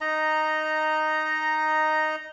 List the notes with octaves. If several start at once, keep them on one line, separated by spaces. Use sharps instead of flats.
D#4 D#5 A#5